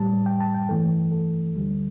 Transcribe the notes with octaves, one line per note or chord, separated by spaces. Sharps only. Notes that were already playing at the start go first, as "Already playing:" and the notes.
Already playing: A2 G3 A5
G5
A5
G5
G2 E3 A3 A4
A4
D2 D3 G3